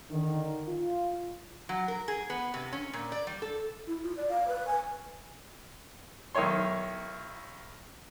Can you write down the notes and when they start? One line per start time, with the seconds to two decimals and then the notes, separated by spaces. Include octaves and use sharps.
0.11 D3 D#3
0.68 F4
1.69 F#3
1.88 A#4
2.08 G#4
2.30 B3
2.54 C3
2.73 C#4
2.93 A#2
3.12 D5
3.27 G3
3.42 A4
3.87 E4
4.03 F4
4.17 D5
4.29 F5
4.48 B4
4.67 G#5
6.35 B1 D#3 E4 C#5 C6